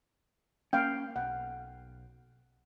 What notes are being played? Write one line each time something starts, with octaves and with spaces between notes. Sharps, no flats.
A#3 C#4 F5 G5
B1 F#5